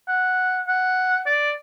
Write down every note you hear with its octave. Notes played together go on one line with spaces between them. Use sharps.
F#5
F#5
D5